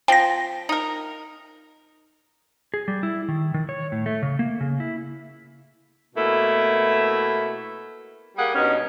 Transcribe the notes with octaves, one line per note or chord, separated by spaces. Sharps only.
F3 C4 G5 A#6
D#4 A#4
G#4
G3
E4
D#3
D#3
C#5
A2
A3
C#3
A#3
C#3
E4
B2 A3 A#3 E4
G3 A#3 G#4 F#5
G2 B2 C#4 D#4